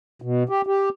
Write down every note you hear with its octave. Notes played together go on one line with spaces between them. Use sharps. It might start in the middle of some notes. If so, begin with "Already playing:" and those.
B2
G4
G4